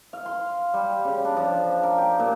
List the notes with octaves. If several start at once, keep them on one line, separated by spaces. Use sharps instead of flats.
F5
C6
G3
C#3
D4
F3
A#4
G4
A#2